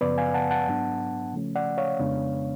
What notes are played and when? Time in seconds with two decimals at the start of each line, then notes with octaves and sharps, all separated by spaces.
0.01 F#2 C#3 F3 B3 B4 D5
0.18 F5 G#5
0.34 F#5 A5
0.51 F#5 A5
0.68 G#2 F#3 B3 D4
1.33 C#3 F3 A3 C#4
1.56 D5 F#5
1.78 C#5 F5
2.00 F2 C#3 G#3 B3 D4